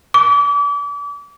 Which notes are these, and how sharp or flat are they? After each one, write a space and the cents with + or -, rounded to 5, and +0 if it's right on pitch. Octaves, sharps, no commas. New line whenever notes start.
D6 -35